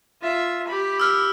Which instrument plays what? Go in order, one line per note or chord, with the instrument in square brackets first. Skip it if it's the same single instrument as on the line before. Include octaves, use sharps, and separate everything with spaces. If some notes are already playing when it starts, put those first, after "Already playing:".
[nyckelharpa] F4 E5
G4 B5
[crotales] E6 F6